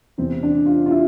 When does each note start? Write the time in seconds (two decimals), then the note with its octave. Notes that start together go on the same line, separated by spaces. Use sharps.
0.18 E2 C3 E3 C4
0.43 D4
0.66 F4
0.86 F4
0.91 E4